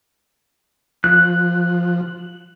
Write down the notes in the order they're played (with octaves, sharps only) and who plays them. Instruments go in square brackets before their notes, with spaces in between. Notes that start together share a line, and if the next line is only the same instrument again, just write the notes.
[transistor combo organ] F3 [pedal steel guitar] F#6